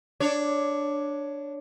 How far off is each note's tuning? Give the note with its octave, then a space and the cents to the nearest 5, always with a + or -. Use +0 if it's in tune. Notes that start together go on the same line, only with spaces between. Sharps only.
D4 +0 C#5 +10